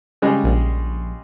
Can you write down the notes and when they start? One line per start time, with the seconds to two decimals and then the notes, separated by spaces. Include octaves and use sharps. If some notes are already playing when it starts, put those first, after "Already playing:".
0.22 C#3 G3 G#3
0.44 A#1